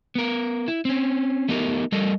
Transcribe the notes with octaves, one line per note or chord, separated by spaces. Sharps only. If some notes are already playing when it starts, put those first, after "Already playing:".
B3 A#4
E4
C4 C#4
A3 B3 D#4 G4 A4 A#4
G3 A4 A#4 D#5